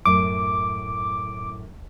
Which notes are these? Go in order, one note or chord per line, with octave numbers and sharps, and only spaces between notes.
F#2 A2 D6